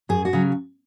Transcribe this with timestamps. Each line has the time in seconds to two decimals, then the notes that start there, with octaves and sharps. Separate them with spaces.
0.09 F#2 G#4
0.25 F#4
0.33 C#3 F#3